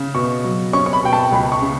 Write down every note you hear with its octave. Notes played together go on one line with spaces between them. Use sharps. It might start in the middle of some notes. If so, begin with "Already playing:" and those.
Already playing: C#3
B2 C#6
F#3
C#4 C#6
C#6
B5
B2 G5
A5
C#2 B5
C#6
C#3